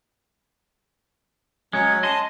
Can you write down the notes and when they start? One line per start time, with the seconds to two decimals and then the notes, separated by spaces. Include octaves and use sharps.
1.73 F#3 G#3 C#4 C#5
2.03 D#5 G#5 A5 C6